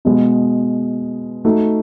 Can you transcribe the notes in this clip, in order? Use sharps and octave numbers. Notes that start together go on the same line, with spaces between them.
B2 G#3 B3
A3 D#4 F#4